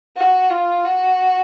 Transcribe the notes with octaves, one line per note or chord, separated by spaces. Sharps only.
F#4
F4
F#4